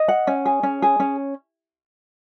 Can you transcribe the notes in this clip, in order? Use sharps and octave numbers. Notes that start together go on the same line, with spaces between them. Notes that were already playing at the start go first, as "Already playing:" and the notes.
Already playing: D#5
F#5
C#4
G#4
C#4
G#4
C#4